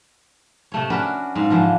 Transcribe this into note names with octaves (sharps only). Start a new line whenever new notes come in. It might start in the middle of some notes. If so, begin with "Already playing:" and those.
C3 A3 C#5
C#4 D4 F#4 A#4 B4
G#2 F5
D3 E3 F3